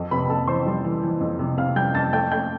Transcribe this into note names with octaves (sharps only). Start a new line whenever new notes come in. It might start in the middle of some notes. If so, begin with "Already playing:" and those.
Already playing: F2
C3 B4 B5
B5
F2 A4 A5
E3 C5 C6
G3
E3
E3
F2
C3
C3 F5 F6
G3 G5 G6
F2 A5 A6
A3 G5 G6
A3 G5 G6